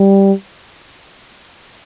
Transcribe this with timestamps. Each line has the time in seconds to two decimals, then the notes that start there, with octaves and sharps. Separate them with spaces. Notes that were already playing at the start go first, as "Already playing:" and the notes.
Already playing: G3